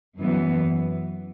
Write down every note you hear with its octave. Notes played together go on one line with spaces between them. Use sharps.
F#2 E3 B3